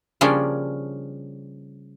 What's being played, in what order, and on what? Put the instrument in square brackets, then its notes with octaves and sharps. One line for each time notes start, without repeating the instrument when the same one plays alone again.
[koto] C#3 F3 G3 A#3 C#4 D4